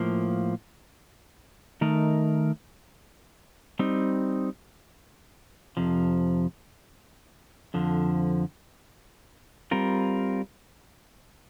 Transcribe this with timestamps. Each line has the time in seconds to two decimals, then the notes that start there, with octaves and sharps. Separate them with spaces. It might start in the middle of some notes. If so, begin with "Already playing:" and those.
Already playing: A2 F3 A#3
1.81 D#3 A3 D#4 A#4
3.79 G3 C4 D#4
5.77 F2 C3 F3
7.74 F2 D3 F3
9.71 G3 C4 F4 A#4